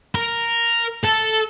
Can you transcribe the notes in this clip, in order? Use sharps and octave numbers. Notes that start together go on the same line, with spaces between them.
A#4
A4